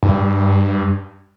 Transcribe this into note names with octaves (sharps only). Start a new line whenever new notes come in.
G2